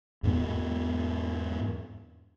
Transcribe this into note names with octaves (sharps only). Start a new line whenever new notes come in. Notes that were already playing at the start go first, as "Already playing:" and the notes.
E2 G#2 B3